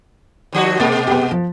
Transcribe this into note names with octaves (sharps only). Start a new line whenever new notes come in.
D#2 F3 F#4
B2 G#3 A#3 A6
B3 G4
F3